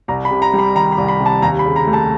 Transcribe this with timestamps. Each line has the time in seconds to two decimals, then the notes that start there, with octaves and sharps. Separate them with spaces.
0.08 C2 A#5
0.25 B5
0.31 C3
0.42 A#5
0.53 G3
0.59 B5
0.75 D#3 A#5
0.92 B5
0.97 C2
1.08 B5
1.20 C3
1.26 A5
1.42 D#2 A#5
1.59 B5
1.65 C#3
1.76 A#5
1.87 A3
1.93 A5